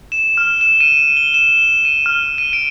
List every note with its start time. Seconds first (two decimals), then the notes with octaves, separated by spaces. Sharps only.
0.12 E7
0.37 F6
0.61 E7
0.80 D#7
1.17 G7
1.34 E7
1.85 D#7
2.06 F6
2.38 D#7
2.53 D7